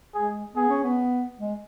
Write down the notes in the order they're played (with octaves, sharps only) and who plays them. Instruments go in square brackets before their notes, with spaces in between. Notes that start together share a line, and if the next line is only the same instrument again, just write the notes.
[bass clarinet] G#3 [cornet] G#4
[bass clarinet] B3 [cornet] G#4
[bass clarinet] C#4
B3
G#3